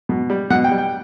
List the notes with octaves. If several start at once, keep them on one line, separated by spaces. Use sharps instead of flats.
B2
G3
B2 F#5
G5
G3
G5